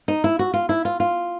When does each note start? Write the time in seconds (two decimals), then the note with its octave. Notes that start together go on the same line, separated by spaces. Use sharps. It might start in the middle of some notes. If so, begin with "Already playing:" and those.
0.08 D#4
0.24 E4
0.39 F#4
0.54 F4
0.69 E4
0.85 F4
1.00 F4